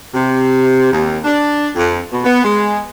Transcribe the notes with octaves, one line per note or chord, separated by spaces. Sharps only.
C3
D#2
D4
F2
B2
B3
G#3